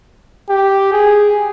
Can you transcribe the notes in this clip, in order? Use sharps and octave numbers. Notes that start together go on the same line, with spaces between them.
G4
G#4